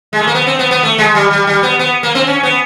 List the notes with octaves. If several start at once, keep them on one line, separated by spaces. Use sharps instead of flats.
G#3
A3
A#3
B3
C4
B3
B3
A3
G#3
G3
G3
G3
B3
B3
A#3
C4
C#4
B3